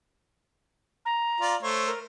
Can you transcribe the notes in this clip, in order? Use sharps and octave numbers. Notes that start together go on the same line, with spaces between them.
A#5
F4 D5
A3 C5 C#5
A#4